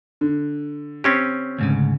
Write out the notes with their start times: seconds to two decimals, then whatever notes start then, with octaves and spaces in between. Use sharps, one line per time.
0.21 D3
1.04 C4 C#4 G4
1.59 D2 G#2 C#3